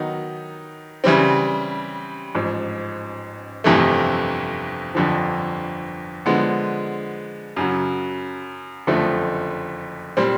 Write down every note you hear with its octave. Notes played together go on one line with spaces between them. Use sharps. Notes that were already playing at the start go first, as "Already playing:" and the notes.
Already playing: D#3 F#3 B3 D#4
C#3 E3 G3 C4
A1 G#2 F3
G1 F2 C3 E3 A3
G1 F2 D3 F3
D3 F3 G#3 B3
F#2 C#3 F#3
F#1 F2 D3 F3 A3
A#2 G3 C4